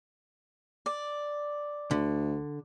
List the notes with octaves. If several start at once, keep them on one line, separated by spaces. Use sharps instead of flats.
D5
D2 D3